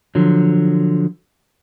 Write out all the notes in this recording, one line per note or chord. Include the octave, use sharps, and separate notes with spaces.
D3 F3 F#3